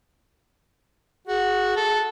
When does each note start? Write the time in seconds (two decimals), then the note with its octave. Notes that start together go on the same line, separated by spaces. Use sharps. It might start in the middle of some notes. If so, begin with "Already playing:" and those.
1.27 F#4 G#4
1.77 A4